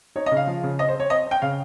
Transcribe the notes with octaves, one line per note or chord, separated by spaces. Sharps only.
D#4 C#5
D#5
C#3
F5
F3
C#3
C4 D#5
C5
C4 C#5
C4 D#5
C4
G5
C#3 F5